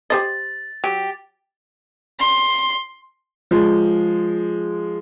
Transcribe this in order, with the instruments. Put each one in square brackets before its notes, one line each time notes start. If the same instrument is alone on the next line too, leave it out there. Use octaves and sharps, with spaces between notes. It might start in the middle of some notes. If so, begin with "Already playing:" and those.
[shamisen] G4 C5 D#5 [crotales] A6
[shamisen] F#3 [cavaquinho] G4
[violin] C6
[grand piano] F3 G#3